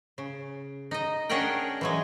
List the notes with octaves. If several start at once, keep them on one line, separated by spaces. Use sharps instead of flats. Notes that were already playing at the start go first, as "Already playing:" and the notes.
C#3
D#4 D#5
C#4 D4 G#4 A#4 F#5 G5
E3 F#3 G#3